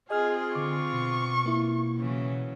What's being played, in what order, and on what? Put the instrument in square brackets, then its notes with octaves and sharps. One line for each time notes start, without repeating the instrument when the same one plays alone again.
[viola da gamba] C4 F4 [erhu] G#4 [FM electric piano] D#5 D#6 F6
[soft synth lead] D3 [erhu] C#6 [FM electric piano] D6
[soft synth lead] B2
[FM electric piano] A#3 E4
[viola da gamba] C#3 E3 F#3